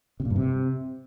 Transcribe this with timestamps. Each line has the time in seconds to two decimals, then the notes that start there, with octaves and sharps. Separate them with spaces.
0.20 C3
0.25 A#2
0.30 G2
0.36 C3